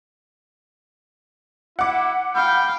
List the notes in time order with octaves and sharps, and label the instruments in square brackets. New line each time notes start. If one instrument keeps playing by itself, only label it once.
[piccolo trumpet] E4 [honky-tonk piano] F#5 D6
[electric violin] F5 G5 [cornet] B5 [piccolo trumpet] G6